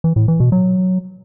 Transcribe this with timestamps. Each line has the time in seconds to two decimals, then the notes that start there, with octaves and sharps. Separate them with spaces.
0.04 E3
0.16 A2
0.28 E3
0.40 B2
0.52 F#3